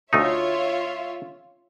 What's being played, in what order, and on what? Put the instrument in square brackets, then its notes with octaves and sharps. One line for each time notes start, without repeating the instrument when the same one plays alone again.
[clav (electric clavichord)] D2 A3 D#4 [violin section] F4 C#5 E5